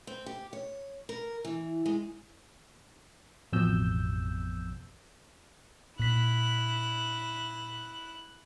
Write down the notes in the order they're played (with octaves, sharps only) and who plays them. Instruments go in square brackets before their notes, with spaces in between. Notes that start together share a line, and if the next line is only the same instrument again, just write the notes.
[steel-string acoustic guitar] C4
G4
C#5
A#4
E3
G#3
[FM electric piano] A1 F2 B2 E6 G6
[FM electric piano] A#2 B6 [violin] E4 F#6